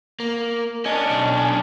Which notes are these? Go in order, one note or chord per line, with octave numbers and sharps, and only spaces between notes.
A#3
C#4 D4 D#5
B1